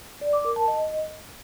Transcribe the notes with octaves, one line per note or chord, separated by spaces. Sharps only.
D5
D6
A#4
A5
D#5